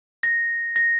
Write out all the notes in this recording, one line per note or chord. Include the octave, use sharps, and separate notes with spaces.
A#6
A#6